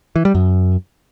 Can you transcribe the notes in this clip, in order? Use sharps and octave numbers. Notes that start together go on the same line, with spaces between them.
E3
G3
F#2